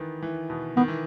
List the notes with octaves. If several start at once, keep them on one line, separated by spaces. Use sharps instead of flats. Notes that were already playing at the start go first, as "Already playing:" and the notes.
Already playing: D#3 E3 B3
E3
B2
D#3 B3
E3